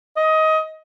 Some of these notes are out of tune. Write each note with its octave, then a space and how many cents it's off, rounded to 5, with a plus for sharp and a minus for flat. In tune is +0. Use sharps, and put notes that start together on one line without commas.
D#5 +20